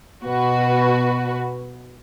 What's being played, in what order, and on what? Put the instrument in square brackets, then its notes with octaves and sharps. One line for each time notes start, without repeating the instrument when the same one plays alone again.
[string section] B2 F#4 B4